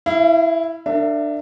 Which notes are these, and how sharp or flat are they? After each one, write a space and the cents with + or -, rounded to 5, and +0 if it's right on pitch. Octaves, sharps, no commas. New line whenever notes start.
E4 +0 F5 -45
D4 +20 A#4 -40 E5 +25